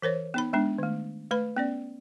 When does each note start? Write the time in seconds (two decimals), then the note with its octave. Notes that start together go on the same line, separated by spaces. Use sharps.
0.02 E3 A#4 C5 C#5
0.34 B3 D#4 B5
0.53 G#3 B3 D4
0.78 D#3 A3
1.31 A3 B4 B5
1.57 B3 C#4 D5